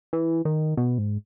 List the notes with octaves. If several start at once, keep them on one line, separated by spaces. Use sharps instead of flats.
E3
D#3
B2
G#2